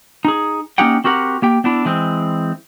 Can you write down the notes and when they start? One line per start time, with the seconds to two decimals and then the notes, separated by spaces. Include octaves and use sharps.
0.25 D#4 G#4
0.78 A#3 C#4 D#4 G4 F#5 G5
1.04 C4 F#4 G4 A#4 F#5
1.42 A#3 G4 G5
1.64 B3 D4 E4
1.85 E3 G#3 C4